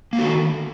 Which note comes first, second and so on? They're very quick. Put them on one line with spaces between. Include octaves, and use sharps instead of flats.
A#3 A3 F#4 D#3